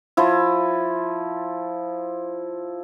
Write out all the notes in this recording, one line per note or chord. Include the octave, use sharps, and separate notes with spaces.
F3 E4